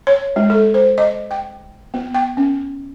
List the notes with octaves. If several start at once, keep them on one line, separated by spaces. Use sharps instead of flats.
C#5
G#3
A4
C5
D#5
G5
B3
G5
C#4